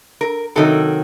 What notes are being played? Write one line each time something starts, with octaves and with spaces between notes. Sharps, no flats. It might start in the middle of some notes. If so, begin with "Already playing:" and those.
A#4
C3 D#3 F#3 A4